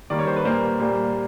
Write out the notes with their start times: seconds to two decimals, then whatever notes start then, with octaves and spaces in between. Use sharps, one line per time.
0.10 D#3 G3 A#3 D5
0.19 C#5
0.27 C5
0.36 B4
0.45 A#2 G3 A#3 C5
0.80 A#2 G3 A#3